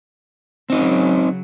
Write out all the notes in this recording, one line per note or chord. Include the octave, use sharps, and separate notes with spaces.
C#3 F#3 C4 D#4